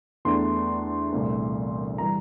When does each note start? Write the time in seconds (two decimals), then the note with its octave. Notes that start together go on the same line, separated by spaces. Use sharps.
0.25 E2 E3 A3 D4 C6
1.12 C2 A#2 A3 C4
1.98 E3 G3 A#5